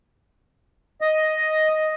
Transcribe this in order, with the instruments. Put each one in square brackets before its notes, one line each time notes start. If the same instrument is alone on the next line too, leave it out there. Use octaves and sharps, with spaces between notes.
[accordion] D#5